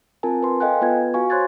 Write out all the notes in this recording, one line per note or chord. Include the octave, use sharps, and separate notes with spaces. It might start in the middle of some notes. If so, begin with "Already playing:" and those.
C4 F4 A#4 G#5 A5
B4 C6
A4 D#5 F5 G5 G#5 F#6
B3 F4 B4 G#6
F#4 F5 G#5 C#6
C5 C#5 C6 F#6 G#6 A6